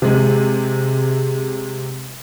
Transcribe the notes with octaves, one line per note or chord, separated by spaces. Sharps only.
C3 G#3